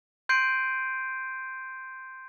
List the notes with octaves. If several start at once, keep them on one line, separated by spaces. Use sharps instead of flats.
C6 G6 C7 D7 D#7